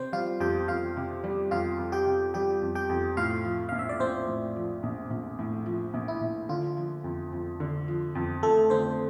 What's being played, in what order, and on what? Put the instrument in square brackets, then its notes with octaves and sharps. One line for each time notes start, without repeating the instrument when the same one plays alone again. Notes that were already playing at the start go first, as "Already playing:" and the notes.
Already playing: [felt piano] C3 [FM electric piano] C4 C5
[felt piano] G3 [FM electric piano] F4 F5
[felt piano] F2 [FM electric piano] G4 G5
[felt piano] F2 [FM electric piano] F4 F5
[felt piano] C3
G3
[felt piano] F2 [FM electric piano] F4 F5
[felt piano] F2
[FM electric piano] G4 G5
[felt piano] C3
[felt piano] G3 [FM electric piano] G4 G5
[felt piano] F2
[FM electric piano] G4 G5
[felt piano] F2
[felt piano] A2 [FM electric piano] F4 F5
[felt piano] F3
[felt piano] A#1 [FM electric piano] F5
[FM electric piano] E5
D5
[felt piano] A#1 [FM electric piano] C4 C5
[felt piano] A2
F3
A#1
A#1
A2
F3
A#1
[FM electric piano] E4
[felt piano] A#1
[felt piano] D3 [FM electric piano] F4
[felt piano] F3
F2
F2
D3
F3
F2
[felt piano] F2 [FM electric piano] A3 A4
[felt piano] D3 [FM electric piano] C4 C5